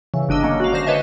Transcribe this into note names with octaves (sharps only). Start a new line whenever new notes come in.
C#3 E3
G1 D4 D#5 E6
F#3 G#3 A#3 C#4
F#4 F5
D3 C5 A#6
B4 C#5 D#5 E5 A5